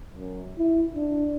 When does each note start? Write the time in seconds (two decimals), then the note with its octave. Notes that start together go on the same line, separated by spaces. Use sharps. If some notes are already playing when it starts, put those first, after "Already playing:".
0.14 F#2
0.58 E4
0.95 D4